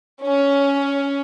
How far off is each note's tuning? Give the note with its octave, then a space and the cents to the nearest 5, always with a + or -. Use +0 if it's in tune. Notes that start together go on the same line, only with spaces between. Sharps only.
C#4 +10